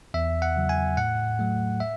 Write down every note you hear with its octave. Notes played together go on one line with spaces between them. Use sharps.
E2 E5
F#5
C#3 F#3
G#5
A2 F#5
F#3 A3
E5